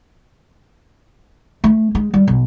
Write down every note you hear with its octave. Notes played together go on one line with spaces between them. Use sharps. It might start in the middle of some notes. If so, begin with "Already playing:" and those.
A3
G#3
G3
B1